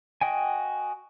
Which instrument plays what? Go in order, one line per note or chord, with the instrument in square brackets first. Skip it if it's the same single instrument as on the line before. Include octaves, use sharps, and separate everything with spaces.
[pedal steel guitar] F#4 D#5 G5 G#5